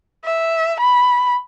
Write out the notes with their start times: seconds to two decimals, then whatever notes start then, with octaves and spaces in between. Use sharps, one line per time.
0.25 E5
0.80 B5